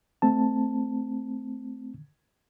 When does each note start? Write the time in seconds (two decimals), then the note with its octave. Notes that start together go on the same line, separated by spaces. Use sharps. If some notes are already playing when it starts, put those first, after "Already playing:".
0.22 A3 C4 A5